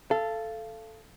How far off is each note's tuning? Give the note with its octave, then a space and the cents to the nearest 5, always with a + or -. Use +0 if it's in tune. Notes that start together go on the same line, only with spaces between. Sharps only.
A4 +0 F5 -30